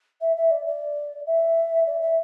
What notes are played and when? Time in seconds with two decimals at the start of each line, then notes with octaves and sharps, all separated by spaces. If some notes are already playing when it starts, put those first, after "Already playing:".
0.21 E5
0.36 E5
0.51 D5
0.66 D5
1.26 E5
1.86 D5
2.01 E5